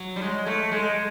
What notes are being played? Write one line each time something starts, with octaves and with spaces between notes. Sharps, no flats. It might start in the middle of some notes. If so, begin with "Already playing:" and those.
Already playing: F#3
G3
G#3
A3
G#3